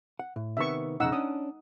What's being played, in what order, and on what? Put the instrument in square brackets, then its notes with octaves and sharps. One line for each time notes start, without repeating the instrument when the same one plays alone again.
[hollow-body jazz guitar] F#5
A2
[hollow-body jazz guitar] C3 D#3 B3 [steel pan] E5 C#6
[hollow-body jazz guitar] B1 F2 C#3 [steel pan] D#4 F#5 E6
[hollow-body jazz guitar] C#4 D4 [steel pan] D#6